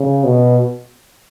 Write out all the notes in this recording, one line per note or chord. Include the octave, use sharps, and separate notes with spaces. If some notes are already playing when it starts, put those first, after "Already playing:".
Already playing: C#3
B2